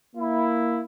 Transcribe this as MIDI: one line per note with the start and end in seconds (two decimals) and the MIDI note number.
0.16 0.81 58
0.16 0.81 64